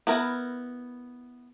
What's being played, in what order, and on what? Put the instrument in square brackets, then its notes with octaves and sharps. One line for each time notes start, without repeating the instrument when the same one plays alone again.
[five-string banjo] B3 E4 A#4